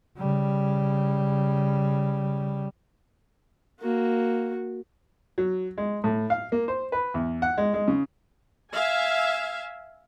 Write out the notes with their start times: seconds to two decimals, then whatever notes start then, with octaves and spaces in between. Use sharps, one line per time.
0.18 C#3 G3
3.80 A#3 F#4
5.38 F#3
5.78 G#3
6.04 A2
6.30 F5
6.52 A#3
6.68 C5
6.92 B4
7.14 E2
7.42 F#5
7.58 G#3
7.74 G#3
7.88 C#3
8.73 E5 F5 G#5